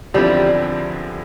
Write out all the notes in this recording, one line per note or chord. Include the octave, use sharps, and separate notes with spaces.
E2 D3 F3 G3 C4 E4